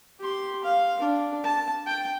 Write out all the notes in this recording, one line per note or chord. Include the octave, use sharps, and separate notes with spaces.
G4 C6
F5
D4
A5
G5